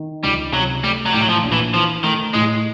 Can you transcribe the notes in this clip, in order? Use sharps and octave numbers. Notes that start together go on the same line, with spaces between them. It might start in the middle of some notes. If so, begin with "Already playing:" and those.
Already playing: D#3
C#2 G3
C3 F#3
G3 A3
F#3
A2 G3
F#3
F3
A#1
E3
E3 F3
D#3 A3
A2 G#3